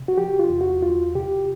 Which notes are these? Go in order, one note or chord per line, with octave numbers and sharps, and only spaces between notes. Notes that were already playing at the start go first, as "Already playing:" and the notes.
Already playing: C3
F#4
F3 G4
F4
E2
F#4
D2 F4
C3 G4